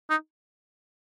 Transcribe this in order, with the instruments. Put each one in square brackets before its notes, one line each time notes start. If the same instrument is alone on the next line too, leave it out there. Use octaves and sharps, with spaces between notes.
[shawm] D#4